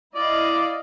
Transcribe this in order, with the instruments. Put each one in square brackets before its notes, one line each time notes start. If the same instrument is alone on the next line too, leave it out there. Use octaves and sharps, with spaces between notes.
[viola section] E4 D#5 F5 [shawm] D5